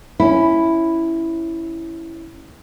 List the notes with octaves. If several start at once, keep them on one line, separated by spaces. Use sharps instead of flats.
C#4 E4